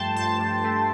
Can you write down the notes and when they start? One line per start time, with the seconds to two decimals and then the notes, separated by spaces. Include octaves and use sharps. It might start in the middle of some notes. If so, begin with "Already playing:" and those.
Already playing: G2 F3 A3 G5 A5 C6
0.15 G2 A5
0.39 G2
0.64 A3